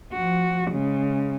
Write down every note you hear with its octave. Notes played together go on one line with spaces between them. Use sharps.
F3 F#4
C#3 G#3